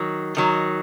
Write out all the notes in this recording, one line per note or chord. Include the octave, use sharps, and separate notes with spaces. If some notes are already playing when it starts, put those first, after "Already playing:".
Already playing: D#3 F#3
D#3 F#3